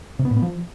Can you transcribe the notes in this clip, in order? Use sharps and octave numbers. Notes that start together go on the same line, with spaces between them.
C3
B3
A2
B3
F3